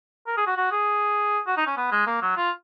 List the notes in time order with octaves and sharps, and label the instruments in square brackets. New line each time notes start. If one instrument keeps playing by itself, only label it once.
[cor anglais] A#4
G#4
F#4
F#4
G#4
F#4
D#4
C#4
B3
G#3
A#3
F#3
F4